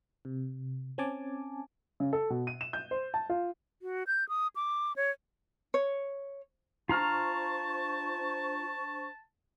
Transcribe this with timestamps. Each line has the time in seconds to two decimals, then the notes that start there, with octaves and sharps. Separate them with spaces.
0.25 C3
0.98 C4 C#4 G#5 A5 D6
2.00 C#3
2.13 A4
2.30 B2
2.47 D#7
2.61 E7
2.73 G6
2.91 C5
3.14 A5
3.29 F4
3.82 F#4
4.07 G6
4.29 D#6
4.56 D6
4.96 C#5
5.74 C#5
6.89 D4 F4 C5 A5 A#5 C#6 F6